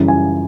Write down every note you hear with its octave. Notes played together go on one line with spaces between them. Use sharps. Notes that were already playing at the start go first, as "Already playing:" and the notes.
Already playing: F#2 C#3 E3 G3
G#5